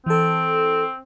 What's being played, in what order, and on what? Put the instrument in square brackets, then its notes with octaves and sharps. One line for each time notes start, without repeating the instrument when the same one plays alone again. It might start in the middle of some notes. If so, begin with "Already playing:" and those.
[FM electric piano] E3 A4 [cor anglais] C4